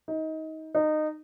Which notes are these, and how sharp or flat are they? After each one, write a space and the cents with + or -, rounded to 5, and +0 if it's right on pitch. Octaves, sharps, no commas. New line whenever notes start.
D#4 +25
D#4 -20